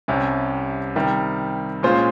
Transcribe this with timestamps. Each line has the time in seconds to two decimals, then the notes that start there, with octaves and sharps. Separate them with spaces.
0.08 C2 C3 G3 C#4
0.96 C3 D#3 G3
1.83 A#2 G#3 C#4 F4 C5